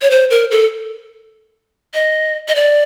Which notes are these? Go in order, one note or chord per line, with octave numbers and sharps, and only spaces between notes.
C#5
C5
A#4
A4
D#5
D#5
D5